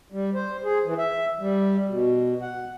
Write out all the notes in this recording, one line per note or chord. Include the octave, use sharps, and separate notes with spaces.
G3
C5
G#4
E3
E5
G3
B2
F#5